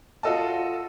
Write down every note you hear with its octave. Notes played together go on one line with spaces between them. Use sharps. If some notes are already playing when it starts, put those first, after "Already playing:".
F4 F#4 A4 D#5 A5